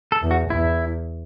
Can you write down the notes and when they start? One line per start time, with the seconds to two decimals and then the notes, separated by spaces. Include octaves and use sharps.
0.12 A4
0.22 E2
0.31 F#4
0.50 E2 E4